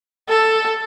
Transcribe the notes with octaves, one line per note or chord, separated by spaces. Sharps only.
A4